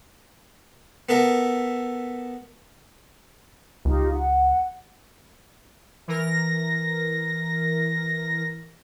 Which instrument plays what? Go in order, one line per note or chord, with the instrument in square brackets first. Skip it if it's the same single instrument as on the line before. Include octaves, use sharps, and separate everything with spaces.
[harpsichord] B3 A4 A#4 E5
[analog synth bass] C#2 [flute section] D#4 F4 G4
[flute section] F#5
[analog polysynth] E3 A#4 A#6